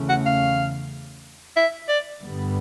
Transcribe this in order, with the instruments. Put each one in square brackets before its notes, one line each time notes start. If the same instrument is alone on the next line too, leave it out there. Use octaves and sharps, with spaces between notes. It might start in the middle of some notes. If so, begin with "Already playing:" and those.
Already playing: [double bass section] E2 C#3 E3 A3 C#4
[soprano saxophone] F#5
F5
E5
D5
[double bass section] G1 G2 D3 G3 B3